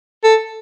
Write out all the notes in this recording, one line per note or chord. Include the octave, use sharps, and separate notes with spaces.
A4